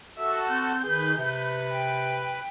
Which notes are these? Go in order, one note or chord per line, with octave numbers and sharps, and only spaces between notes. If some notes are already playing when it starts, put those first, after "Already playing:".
F#4 A4 E5
C4 G6
D#3 G#4 B4
C3 B4
G5